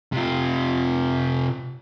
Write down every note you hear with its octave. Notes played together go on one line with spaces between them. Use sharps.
C3 F4